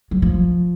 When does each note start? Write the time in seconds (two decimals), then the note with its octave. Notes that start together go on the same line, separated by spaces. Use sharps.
0.11 F#3
0.22 F3